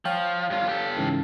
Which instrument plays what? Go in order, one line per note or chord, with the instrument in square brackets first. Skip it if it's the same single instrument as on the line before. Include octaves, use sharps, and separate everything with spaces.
[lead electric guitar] F3 [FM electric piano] C#5 F5 G5
[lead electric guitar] G2 F4
G4 A4
[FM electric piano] G#2 C#3 E3